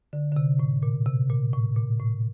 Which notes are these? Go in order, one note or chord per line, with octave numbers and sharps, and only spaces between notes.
D3
D3
C3
A2
A#2
C3
A#2
A2
A#2
A2